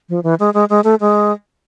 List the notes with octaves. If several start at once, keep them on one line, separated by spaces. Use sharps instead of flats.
F3
E3
G#3
G#3
G#3
A3
G#3